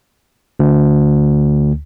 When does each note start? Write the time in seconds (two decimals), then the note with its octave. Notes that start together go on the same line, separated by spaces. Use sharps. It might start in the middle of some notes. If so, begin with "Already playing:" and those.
0.59 D2